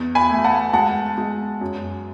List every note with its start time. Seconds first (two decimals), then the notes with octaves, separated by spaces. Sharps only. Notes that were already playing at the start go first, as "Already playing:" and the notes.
Already playing: E2
0.15 G#5 B5
0.30 A3
0.44 F#5 A5
0.73 G#3 F#5 A5
1.18 G#3
1.61 F#2